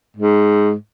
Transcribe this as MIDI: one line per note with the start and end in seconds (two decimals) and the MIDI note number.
0.17 0.73 44